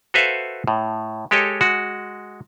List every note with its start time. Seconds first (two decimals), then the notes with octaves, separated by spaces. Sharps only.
0.14 F#4 A4 B4 C5 E5 F5
0.67 A2
1.31 G#3 G4 A4 C#5 D#5
1.61 G#3 F#4